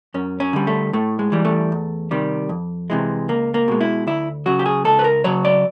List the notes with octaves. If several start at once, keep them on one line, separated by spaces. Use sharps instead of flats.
F#2 C#4
C#4
D3 G3
A3
A2 A3
G#3
E3 G3
A3
E2
C3 D#3 G3
F2
C3 E3 G#3
C#2 A#3
A#3
B2 G#3
E4
D2 E4
C#3 F#3 F#4
G4
G#4
C#2 A4
B4
A#4
C#3 F#3 C#5
D5